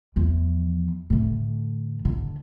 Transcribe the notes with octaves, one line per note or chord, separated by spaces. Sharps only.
E2 F3
A2 D3
D3